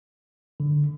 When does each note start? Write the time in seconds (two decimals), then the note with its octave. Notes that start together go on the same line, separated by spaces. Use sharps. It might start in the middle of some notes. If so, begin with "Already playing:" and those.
0.60 D3